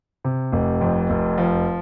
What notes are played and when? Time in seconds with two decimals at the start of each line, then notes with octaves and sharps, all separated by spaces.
0.24 C3
0.52 F1
0.81 F2
1.10 F1
1.38 F3